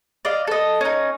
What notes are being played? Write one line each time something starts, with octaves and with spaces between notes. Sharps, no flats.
D5 D#5 F5
A4 D#5
C#4 D#4